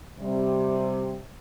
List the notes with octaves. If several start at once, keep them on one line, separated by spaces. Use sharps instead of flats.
C3 G3